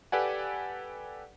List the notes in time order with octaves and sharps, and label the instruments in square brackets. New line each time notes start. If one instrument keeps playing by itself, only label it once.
[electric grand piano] G4 A4 B4 D5 F#5 G#5